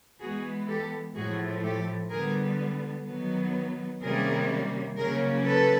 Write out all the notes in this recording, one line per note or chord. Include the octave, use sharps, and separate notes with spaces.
E3 G#3 B3 F#4 G#4
G4 A4
A2 F3 A3 F#4 G#4
G4 A4
D3 G3 B3 G#4 A#4
D#3 F#3 B3
C3 D#3 G3 A#3 C#4 G#4 A#4
C#3 F#3 A#3 C#4 G#4 A#4
A4 B4